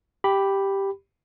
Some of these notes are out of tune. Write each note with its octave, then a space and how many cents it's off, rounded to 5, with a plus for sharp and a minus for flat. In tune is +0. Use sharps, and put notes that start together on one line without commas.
G4 +0 B5 +0